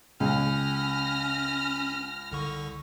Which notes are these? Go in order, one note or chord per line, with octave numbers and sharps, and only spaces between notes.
C#2 C#4 F6 A#6
C2 D3 C#6